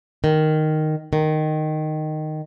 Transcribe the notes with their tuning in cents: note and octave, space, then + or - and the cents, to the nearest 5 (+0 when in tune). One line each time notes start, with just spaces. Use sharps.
D#3 -5
D#3 -10